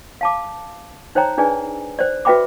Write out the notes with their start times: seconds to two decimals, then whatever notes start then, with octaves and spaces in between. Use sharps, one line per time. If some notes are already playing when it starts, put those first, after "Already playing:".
0.21 F5 A5 D6
1.15 D#4 C5 C#5 G5 A#5
1.38 D4 D#4 G#4 B4 D5 G#5
1.99 C5 D5
2.25 F#4 B4 E5 G5 B5 D6